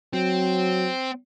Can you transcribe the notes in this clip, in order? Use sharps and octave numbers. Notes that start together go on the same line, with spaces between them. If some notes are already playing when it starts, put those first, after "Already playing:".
F#3 C4